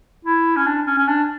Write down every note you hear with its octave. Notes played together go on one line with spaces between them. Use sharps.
E4
C#4
D4
C#4
C#4
D4